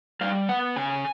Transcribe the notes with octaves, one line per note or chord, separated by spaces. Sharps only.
G3 F5
B3 F#5
C#3 G#5